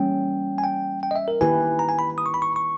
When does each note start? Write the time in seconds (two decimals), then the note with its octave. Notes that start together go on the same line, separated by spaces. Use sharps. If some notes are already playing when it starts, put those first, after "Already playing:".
Already playing: E3 G3 A#3 C#4 G5
0.58 G#5
0.64 G5
1.03 G5
1.11 D#5
1.16 E5
1.28 A#4
1.41 D#3 A#3 E4 G4 B4 G#5
1.79 A#5
1.89 G#5
1.99 B5
2.18 D#6
2.26 C#6
2.34 B5
2.42 C#6
2.56 C#6